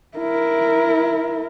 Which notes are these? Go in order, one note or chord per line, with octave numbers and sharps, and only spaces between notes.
E4 A#4